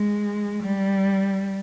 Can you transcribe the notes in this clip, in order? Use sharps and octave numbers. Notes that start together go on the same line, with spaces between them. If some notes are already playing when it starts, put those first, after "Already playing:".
Already playing: G#3
G3